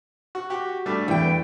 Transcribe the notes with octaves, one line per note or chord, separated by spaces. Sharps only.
F#4
F#4 G4
G3 A3 D4
E2 G5